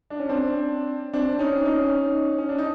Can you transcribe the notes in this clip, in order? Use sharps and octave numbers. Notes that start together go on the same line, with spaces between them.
D4
C#4
C4 D4
C4 D4
C#4 D#4
C#4 D#4
C#4
D4
D#4